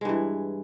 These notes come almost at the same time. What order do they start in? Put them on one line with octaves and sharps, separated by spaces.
G#3 G2 E3